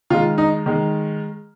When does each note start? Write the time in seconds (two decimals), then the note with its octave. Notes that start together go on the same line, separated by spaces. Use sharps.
0.10 D#3 G#3 F4
0.38 D#4
0.66 D#3 G#3